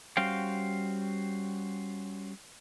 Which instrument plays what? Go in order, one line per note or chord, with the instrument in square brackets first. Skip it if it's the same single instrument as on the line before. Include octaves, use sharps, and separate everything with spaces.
[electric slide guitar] G3 C#4 F#4 C5 F5 G5